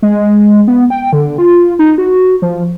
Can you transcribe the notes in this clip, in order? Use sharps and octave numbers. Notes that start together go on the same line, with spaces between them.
G#3
B3
G5
D3
F4
D#4
F#4
F3